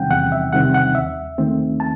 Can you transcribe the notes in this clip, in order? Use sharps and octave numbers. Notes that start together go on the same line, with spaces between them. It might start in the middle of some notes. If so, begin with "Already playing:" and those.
Already playing: E2 C3 D#3 G3 C4 F#5 G5
E2 F#5
E5
C3 D#3 G3 C4 F#5
F#5
D#2 E5
D#3 A3 C4
A5